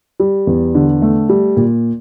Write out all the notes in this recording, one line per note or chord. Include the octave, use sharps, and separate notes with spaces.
G3
E2
D3
A3
G3
A#2